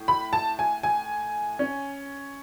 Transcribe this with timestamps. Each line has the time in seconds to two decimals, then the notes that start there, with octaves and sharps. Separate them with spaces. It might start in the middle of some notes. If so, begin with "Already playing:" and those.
Already playing: A2
0.08 B5
0.33 A5
0.59 G#5
0.83 G#5
1.59 C#4